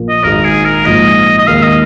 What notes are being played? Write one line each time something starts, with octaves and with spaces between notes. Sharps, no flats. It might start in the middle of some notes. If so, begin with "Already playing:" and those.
Already playing: A#1 A#2 A#3
D#5
G#1 G#2 G#3 D#4 A#4
G#4
A#4
A#1 G#2 F3 D#5
D#5
D#2 D#3 G#3 D#4 F5
D#5